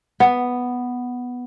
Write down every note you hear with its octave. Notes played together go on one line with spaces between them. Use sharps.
B3